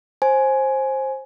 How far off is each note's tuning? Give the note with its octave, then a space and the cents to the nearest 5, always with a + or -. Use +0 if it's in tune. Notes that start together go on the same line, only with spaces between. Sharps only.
C5 +20 G#5 +10